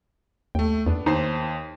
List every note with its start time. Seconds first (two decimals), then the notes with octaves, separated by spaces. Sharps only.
0.55 D#2 A3 G5
0.86 E2 B3 D4
1.06 D#2 D#4 C5 C7